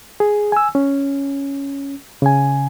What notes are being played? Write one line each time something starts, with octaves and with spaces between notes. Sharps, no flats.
G#4
G#5 E6
C#4
C#3 G#5